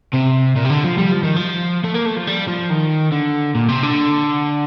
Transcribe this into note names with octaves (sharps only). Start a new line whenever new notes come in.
C3
A#2
C3
D3
F3
G3
F3
D#3
F3
A3
A#3
A3
F3
G3
F3
D#3
D3
A#2
C3
D3